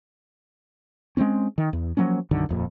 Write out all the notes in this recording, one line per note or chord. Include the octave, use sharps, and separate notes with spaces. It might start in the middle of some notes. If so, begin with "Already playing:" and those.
G#3 A3 C4 C#4
D#3
E2
F3 F#3 A#3 C#4
B1 F#2 D3 D#3
D#1 F2 A#2